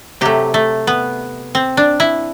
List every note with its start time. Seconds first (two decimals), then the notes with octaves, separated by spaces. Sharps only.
0.21 C3 F#3 A3 G4
0.54 A3
0.87 B3
1.55 C4
1.77 D4
2.00 E4